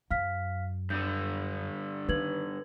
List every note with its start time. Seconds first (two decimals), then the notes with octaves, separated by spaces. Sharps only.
0.11 F#2 F5 F6 B6
0.90 G2 D3 G6
2.09 D#3 B4 G#6 F#7